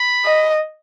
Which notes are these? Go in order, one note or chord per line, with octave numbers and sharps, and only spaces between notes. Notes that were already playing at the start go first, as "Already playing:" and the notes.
Already playing: B5
D#5